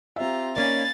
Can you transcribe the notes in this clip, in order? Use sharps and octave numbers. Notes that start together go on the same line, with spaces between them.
C4 F4 G4 E5 A#5
A#3 C#4 D#4 D5 F5 G#5 B5 A6